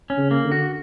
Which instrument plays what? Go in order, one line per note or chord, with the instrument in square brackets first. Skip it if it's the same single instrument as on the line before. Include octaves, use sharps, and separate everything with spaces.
[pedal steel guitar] C#4
[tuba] C#3
[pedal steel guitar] A#3
[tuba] D3
[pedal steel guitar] F#4